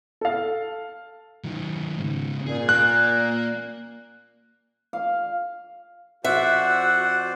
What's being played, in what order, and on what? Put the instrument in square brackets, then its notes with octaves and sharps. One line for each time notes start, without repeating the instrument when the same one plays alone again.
[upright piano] A4 F5
[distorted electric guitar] D#3 F#3
G#2 C#3
[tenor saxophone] A#2 [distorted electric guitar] G#4
[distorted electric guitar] A#3 [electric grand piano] F#6
[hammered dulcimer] F5
[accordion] F2 C5 D5 [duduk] F#4 [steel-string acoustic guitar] E5 [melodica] F#5